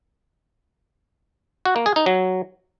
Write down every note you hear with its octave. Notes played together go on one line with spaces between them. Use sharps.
F#4
A#3
G#4
D#4
F#3